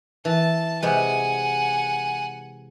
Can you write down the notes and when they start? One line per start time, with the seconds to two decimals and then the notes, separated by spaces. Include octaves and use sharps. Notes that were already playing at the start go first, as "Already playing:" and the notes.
0.25 E3 A5
0.82 C3 G#3 B4 F#5 G#5